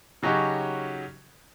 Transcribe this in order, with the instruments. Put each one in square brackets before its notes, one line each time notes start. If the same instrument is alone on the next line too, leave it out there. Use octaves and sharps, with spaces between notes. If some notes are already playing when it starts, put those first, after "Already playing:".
[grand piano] C#3 F#3 C#4 D#4 F#4 G4